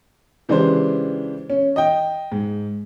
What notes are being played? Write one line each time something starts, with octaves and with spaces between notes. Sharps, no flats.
C#3 E3 G#3 D4 G4 C5
C#4
D#5 G5
G#2